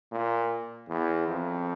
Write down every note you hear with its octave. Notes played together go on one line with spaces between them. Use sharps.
A#2
E2
F2